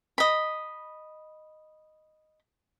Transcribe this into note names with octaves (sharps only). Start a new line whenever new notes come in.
D#5 B5